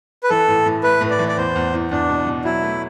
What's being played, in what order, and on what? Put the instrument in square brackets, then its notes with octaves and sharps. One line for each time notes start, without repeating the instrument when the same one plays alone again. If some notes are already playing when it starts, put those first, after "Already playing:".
[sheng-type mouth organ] B4
[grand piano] E3 [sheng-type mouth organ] A4
[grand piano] A2
A2
[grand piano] A3 [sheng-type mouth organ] B4
[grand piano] A2
[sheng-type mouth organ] D5
[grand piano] E3
[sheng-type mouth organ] D5
[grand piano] E2 [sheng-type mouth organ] C5
[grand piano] E2
E2
[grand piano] E2 [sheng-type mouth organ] D4
[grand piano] B2
B2
[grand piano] F#3 [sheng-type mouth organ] E4
[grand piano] A3